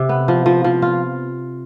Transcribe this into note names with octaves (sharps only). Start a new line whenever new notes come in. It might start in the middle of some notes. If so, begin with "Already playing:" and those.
Already playing: C3
B3
F3
F3
F3
F4